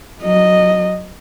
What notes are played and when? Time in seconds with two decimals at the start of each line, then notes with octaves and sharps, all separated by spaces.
0.24 F#3 D#5